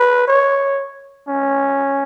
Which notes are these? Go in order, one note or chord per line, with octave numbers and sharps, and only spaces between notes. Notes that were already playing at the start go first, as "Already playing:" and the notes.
Already playing: B4
C#5
C#4